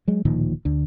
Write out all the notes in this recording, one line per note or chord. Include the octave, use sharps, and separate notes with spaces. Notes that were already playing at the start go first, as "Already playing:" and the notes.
F#3 G#3
D1 A#2 D#3 F3
D2 D3